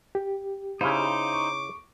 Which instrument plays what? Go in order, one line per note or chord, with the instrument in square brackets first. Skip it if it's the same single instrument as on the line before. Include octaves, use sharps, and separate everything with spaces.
[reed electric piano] G4
[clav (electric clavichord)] C#3 E4 F5 [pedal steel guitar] D#4 C5 [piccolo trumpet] D6
[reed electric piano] C#6